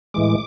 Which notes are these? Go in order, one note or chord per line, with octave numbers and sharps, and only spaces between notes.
A2 E3 G#3 D6